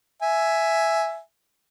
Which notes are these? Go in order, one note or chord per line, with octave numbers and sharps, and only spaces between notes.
E5 G#5